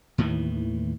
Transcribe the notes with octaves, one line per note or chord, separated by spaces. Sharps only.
D#2 A2 D#3 E3